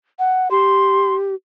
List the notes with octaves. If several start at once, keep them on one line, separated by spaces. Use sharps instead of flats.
F#5
G4 C6